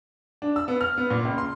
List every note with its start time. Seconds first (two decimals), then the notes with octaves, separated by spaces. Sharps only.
0.42 D4
0.56 E6
0.68 B3
0.81 F6
0.98 B3
1.10 A#2
1.25 C#2
1.38 C6